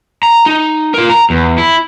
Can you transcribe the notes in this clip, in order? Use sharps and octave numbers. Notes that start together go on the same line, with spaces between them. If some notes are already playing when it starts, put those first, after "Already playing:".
A#5
D#4
F4 A#4
A#5
E2
E4